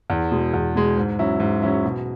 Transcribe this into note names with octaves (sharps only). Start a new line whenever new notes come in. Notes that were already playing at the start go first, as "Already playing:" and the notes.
E2
B2 G#3
E2
B2 G#3
G#2
F#3 C#4 E4
G#2
F#3 C#4 E4
B2